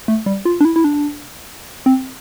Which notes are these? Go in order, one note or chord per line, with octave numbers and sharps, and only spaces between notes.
A3
G3
F4
D4
E4
E4
D4
C4